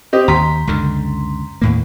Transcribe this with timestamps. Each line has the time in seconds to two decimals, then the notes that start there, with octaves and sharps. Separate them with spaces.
0.13 C4 G4 D#5
0.28 D#2 A#5 C6 B6
0.67 C#2 F#2 D3
1.62 D#2 A2 A#3